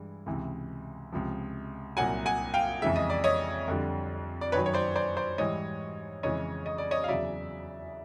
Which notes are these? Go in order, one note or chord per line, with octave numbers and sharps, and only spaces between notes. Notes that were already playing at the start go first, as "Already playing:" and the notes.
Already playing: G2 E3 G#3
C#2 C3 E3
C#2 C3 F3
C2 A#2 F#3 F#5 G#5
F#5 G#5
F5 G5
F2 C#3 E3 G#3 E5
D#5
D5
C#5 D#5
F2 D3 G3
D5
F#2 D#3 F#3 B4 C#5
C#5
C5 D5
C5 D5
C5 D5
G#2 E3 G3 C#5 D#5
F2 C#3 E3 G#3 C#5 D#5
D#5
D5
C#5 D#5
F5
E2 C#3 F#3 D5 E5